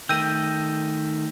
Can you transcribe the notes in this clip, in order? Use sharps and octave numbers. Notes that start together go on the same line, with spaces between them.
D#3 A3 G5 E6 G6 A#6 D#7